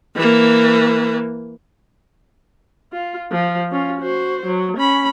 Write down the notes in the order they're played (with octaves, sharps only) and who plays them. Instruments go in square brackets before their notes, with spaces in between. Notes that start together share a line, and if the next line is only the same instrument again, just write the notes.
[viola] E3 A#3
F4
F3
C#4 F4
F#4 C5
F#3
C#4 B5